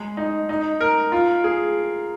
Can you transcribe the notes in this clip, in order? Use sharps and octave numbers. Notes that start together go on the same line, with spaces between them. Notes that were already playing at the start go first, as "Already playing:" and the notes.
Already playing: G#3 G#4
D#4
D#4
A#4
F4
G#4